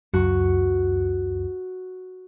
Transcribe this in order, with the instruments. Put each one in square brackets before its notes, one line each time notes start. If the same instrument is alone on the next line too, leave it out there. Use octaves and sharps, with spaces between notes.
[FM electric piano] C#2 F#2 [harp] F#4